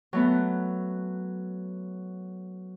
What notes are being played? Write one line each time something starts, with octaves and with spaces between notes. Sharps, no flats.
F#3 A3 B3